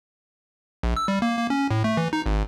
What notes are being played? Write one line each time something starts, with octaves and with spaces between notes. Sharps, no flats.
A#1
E6
G3
A#3
A#3
C#4
A2
A3
E3
D#4
G#1